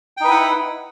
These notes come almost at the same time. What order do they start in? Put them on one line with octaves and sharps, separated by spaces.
G5 D#4 B4 E4 F#5